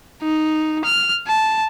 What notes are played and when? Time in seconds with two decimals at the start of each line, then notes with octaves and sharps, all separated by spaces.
0.23 D#4
0.85 F6
1.28 A5